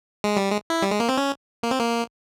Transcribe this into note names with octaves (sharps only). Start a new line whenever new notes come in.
G#3
G3
G#3
E4
G3
G#3
A#3
C4
C#4
A#3
C4
A#3